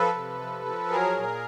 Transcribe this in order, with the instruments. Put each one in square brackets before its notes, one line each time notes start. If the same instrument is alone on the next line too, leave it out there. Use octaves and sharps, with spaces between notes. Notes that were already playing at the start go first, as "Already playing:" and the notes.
Already playing: [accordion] F3 A4 B4
C3
F3
F3
F#3 G#4 A#4
A#2